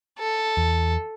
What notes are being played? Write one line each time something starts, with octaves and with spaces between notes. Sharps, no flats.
A4
E2